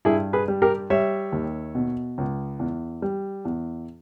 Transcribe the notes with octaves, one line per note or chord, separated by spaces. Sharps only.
G2 E4 G#4
G#4 B4
G3
G4 A#4
G3 C#5 E5
D#2
B2
C#2
E2
G3
E2